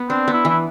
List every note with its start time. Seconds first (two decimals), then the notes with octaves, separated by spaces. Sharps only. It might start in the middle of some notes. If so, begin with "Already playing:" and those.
Already playing: B3
0.09 C4 D4
0.28 B3
0.33 E4
0.45 E3 E4